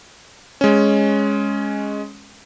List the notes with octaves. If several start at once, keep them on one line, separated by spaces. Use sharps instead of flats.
G#3 C#4